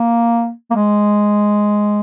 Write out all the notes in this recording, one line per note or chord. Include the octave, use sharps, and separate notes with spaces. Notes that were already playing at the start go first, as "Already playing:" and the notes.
Already playing: A#3
A#3
G#3